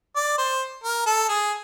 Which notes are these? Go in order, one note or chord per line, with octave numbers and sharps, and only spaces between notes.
D5
C5
A#4
A4
G#4